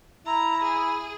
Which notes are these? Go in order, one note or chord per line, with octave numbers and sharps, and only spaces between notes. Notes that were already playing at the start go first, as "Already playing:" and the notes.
E4 A#5
G#4